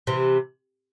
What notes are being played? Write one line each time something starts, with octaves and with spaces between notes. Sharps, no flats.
C3 E3